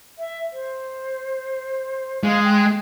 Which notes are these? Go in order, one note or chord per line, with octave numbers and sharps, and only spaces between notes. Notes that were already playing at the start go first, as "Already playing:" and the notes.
E5
C5
G#3 F5
G5